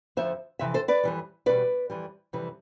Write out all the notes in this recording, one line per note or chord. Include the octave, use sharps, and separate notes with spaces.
F2 D3 F3 C5 E5
F2 C3 E3 E5
A4 C5
B4 D5
F2 E3 G3
E2 B2 G3 B4 D5
F2 E3 G3
F2 C3 E3 G3